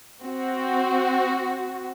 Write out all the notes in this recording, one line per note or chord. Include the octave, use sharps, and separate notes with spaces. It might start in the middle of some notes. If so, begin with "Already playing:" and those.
C4 F#4